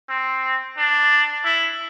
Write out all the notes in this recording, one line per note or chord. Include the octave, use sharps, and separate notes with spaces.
C4
D4
E4